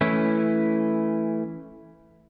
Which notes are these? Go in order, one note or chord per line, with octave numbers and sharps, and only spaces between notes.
E3 A3 C#4 E4